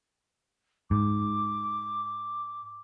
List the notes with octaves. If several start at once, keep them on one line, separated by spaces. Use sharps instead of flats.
G#2 D6